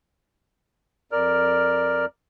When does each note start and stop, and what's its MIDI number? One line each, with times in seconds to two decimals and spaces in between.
1.12 2.05 41
1.12 2.05 70
1.12 2.05 74
1.12 2.05 89